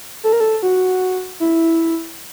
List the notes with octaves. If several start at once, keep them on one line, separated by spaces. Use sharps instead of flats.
A4
A#4
A4
F#4
E4